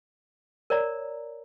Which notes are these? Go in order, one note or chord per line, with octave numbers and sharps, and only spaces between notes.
A#4 C#5 D5 A#5